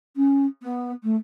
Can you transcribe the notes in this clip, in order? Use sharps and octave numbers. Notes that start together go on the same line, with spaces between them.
C#4
B3
A3